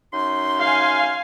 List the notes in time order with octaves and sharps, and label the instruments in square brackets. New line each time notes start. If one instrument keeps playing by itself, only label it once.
[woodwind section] F#2 D#4 C6
[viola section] F5 G#5